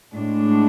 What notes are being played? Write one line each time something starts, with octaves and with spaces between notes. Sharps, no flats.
A2 G#3 D4